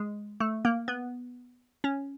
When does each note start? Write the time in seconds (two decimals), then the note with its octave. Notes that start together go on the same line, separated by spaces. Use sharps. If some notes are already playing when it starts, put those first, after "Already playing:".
Already playing: G#3
0.40 A3
0.65 A#3
0.88 B3
1.84 C#4